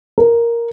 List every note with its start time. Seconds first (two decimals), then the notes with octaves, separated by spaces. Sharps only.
0.18 A#4